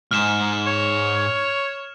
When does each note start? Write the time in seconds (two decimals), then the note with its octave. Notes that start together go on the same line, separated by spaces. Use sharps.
0.11 G#2 F6 E7
0.67 C#5